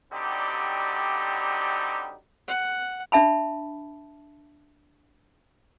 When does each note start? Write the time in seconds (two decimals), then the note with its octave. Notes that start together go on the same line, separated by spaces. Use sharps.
0.12 D3 F#3 G3 C4 D#4 G4
2.48 F#5
3.12 D4 E5 A5 B5